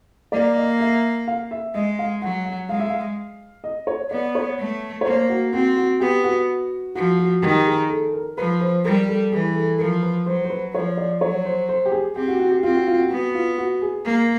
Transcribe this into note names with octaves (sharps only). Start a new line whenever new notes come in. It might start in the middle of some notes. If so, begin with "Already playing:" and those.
A#3 D5
D#5
E5
F5
E5
G#3 D#5
F5
F#3 F#5
F#5
G#3 F5
E5
F5
D#5
C#5
B3 D5
C#5
A3
C#5
A#3 C5
F#4
C4 F#4
F#4
B3 G4
F#4
F3 F#4
F#4
D#3 G4
G#4
A4
A#4
F3 B4
C5
G3 A#4
A4
E3 G#4
A4
F3 A#4
B4
F#3 C5
C5
B4
F3 C#5
D5
F#3 C#5
C5
C5
G4
G#4
C4 G4
F#4
F#4
G4
C4 F4
F#4
F4
F#4
B3 F#4
F4
F#4
G#4
A#3